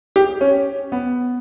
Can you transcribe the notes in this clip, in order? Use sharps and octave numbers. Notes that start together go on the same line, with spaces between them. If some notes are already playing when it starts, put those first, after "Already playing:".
G4
C#4
B3